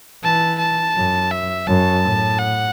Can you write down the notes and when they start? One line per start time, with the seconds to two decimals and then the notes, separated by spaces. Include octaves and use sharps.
0.24 E3 A5
0.59 A5
0.95 F#2
1.32 E5
1.67 F#2 A5
2.04 A2
2.39 F#5